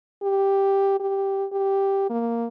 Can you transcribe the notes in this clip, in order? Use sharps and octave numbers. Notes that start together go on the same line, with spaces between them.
G4
G4
G4
A#3